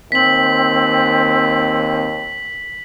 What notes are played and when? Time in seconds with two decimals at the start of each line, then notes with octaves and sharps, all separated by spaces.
0.12 D#2 C4 B6 F#7